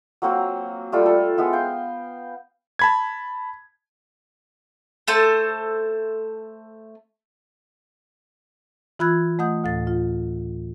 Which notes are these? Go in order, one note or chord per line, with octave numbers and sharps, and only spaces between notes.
F#3 A#3 C4 F#4
G3 A3 F4
A4
G#3 B3 E4
F5 G5
A5 B5 G#6
A3 A4 C5
E3 F4 B5 E6 F#6 G#6
A3 D#5 F#5 D#6 G6
D2 A2 A6
F4